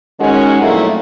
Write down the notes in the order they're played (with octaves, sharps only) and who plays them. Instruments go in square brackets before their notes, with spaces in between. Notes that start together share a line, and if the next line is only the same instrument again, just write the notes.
[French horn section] D#3 G#3 C#4 D#4 F#4 A#4
F2 A#2 F#3 A3 A#3 E4